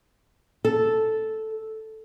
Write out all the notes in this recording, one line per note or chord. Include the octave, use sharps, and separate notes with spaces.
A4